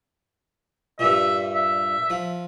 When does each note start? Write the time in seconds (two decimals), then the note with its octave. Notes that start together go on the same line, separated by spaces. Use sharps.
0.99 G2 A#2 E5
1.53 E5
2.10 F3